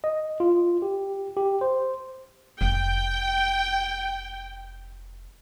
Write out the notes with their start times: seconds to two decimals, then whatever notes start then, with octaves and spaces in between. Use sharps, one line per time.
0.04 D#5
0.40 F4
0.82 G4
1.37 G4
1.61 C5
2.61 F1 G5